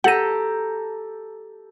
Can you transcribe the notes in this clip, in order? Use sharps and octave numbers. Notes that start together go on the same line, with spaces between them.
G4 A4 F#5 A#5 D#7